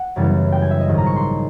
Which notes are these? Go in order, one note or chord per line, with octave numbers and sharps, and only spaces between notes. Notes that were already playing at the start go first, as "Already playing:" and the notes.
Already playing: F#5
F#2 C#3 E3 G3 B3
G5
G#5
E5
D#5
A#1 G#2 D#3 G#3
A#5
C#6
C6